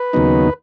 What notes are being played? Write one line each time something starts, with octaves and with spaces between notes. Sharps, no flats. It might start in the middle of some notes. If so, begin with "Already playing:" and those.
Already playing: B4
D#2 C#3 F#3 B3 D#4